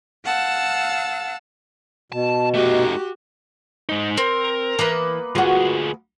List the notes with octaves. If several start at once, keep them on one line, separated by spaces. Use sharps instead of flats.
F5 F#5 A5 E6
B2 A5
A3 D#4 F#4 G4
G#3 D#4
C4 A#4
E3 A#3 B3 B4
D2 F4 F#4 G#4